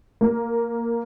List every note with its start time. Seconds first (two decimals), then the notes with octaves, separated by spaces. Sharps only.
0.21 A#3